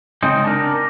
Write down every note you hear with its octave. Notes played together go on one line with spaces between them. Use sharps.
C#3 G#3 C4 D#4
D4 A#4